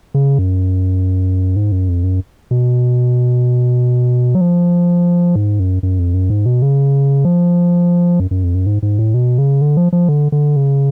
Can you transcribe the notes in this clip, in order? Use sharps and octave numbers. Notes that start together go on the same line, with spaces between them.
C#3
F#2
G#2
F#2
F2
F#2
B2
F#3
F3
G#2
F#2
F#2
F2
F#2
G#2
B2
C#3
F3
F#2
F#2
F2
F#2
G#2
G#2
A2
B2
C#3
D3
F3
F3
D3
D3
C#3